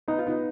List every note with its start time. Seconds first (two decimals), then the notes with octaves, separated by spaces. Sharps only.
0.08 B3 D#4
0.19 F4
0.27 B3 D#4